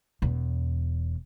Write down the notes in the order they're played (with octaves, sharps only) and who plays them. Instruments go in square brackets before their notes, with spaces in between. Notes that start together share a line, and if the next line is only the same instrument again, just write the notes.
[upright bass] E1 E2